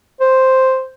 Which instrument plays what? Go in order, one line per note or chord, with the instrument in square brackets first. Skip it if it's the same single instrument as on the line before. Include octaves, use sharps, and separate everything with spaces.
[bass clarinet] C5